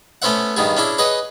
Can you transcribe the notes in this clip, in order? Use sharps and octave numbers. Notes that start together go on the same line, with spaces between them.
A3 B3 C#4 C5 E5 F#5
G2 D#3 B3 G#4
C#4 D4 E4 G#4
G#4 B4 C#5 D#5 F#5